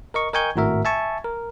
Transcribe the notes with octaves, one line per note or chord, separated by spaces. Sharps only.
A#4 D#5 C#6
A#4 D#5 G5 G#5 C#6 G6
G#1 A2 F#4 A#4 E5
E5 G#5 A5 C#6
A#4